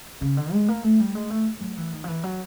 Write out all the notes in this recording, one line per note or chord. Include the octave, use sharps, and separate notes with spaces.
C#3
D3
G#3
A#3
A3
G3
G#3
A3
F#3
E3
D#3
F3
E3
F#3